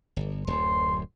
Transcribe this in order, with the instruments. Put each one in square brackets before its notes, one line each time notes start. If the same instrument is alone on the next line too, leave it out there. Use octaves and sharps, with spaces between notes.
[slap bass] G1
[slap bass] D1 F#2 [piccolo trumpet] C6